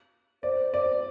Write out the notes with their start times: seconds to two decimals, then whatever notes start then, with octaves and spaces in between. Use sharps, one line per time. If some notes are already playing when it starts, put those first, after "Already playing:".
0.43 C5 D5
0.74 D5